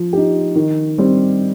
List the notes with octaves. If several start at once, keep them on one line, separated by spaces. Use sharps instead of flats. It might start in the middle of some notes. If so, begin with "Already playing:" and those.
Already playing: F3
D#4 G4
D#3
G3 C4 G4